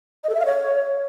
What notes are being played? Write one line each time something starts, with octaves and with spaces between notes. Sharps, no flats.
D#5
A4
E5
F5
C#5